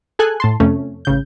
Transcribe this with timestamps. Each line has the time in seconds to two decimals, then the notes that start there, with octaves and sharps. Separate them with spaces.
0.19 G#4 A4 G#5 F#6
0.40 A2 A5 C6
0.60 F2 C3 A3 C#4
1.05 A1 C#3 G6